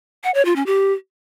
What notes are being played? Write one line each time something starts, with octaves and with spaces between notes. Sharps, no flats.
F#5
C#5
F4
C#4
G4